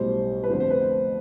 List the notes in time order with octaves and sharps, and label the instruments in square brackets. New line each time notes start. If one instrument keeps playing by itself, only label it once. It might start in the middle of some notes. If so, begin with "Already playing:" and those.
Already playing: [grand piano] B1 A2 G3 C5
B4
F1 F2 D3 C5
C5
B4
C5